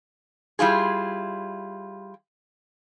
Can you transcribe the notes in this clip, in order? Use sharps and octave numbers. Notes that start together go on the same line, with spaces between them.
G3 E4 F4 G#4